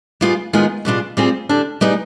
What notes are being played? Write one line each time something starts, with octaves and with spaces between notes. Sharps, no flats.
G3 B3 F4 G#4
D#3 G#3 B3 F4 G#4
B2 G3 D4 F4 G#4
G3 C4 F4 G#4
D3 G3 D4
G3 B3 D#4 G#4